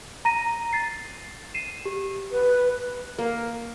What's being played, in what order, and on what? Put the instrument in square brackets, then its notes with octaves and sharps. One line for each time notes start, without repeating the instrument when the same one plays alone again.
[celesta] A#5 A#6 D#7
A6 C7
C7 D#7 E7
G4
[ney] B4
[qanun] A#3